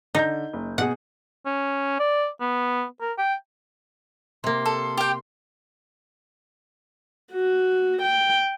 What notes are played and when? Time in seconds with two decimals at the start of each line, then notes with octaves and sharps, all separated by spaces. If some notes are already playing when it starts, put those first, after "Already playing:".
0.15 D3 D#4 G6
0.53 F#1
0.78 B2 G#4 F#5
1.46 C#4
1.99 D5
2.41 B3
3.01 A#4
3.18 G5
4.44 C3 A#3 C6
4.66 A4
4.97 G4 G5
7.33 F#4
8.02 G5